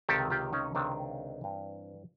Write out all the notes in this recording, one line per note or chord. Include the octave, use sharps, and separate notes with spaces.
C#2 C3 D#3 G4 A4
F4 G4
C#4 D#4
C#2 C3 D#3 C4 D4
G2 E3